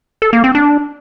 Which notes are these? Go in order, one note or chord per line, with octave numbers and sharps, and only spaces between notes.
A4
A#3
C4
D4